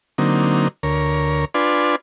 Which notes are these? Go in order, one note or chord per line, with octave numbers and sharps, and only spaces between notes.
D3 F#3 A#3 C4 D#4
D2 A#4 C#5
D4 F4 B4 D5 G#5 C6